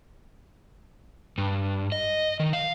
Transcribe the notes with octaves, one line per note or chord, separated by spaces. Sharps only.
G2
D#5
D#3
F5